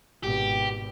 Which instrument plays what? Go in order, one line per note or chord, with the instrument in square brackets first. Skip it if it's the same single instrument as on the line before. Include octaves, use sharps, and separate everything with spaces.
[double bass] G#1 B2 [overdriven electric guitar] G4